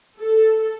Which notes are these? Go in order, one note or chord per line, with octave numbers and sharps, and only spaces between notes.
A4